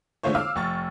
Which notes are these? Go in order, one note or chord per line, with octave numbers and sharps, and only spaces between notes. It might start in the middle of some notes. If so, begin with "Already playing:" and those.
D3 G#3 A3 F4 C5 C#5
F5 D6 E6 F6
F1 C#6 A6